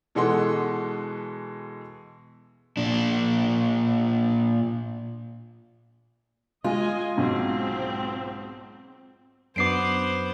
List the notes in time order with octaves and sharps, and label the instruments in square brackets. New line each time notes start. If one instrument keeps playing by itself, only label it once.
[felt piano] B2 E3 G#3 A4 F#5 C6
[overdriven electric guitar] A#2 D4
[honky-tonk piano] G#3 [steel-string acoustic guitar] F4 [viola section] D#5 G#5
[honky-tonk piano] B1 G#2 [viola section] C4
[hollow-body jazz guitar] F#2 D4 F#4 [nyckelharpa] B3 C5 [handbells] D6 C7 D7